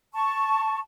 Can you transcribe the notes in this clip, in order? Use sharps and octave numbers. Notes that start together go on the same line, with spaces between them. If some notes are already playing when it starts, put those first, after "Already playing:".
A5 C#6